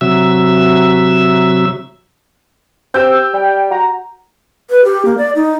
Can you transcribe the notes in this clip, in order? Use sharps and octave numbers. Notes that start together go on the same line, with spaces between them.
C3 F#3 E5
C4 G4 E6 G6
G3 G5
F#4 A#5
B4
G4
A#3
D5
D#4